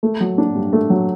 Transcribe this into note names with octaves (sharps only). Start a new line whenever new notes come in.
A3
F#3
D4
G2
A3
F#3